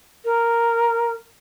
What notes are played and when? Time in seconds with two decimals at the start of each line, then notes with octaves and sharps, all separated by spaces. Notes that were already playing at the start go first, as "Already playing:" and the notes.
0.25 A#4